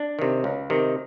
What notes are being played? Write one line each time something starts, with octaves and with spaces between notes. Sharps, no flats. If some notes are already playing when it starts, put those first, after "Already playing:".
Already playing: D4
C3 D#3
C#2
C3 D#3